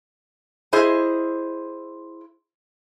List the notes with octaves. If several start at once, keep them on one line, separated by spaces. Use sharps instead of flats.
E4 G#4 C5 D#5